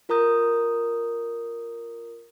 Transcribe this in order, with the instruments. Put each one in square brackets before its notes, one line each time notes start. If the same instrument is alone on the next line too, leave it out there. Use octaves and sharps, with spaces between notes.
[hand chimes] F4 A#4 A#5 D#6 G6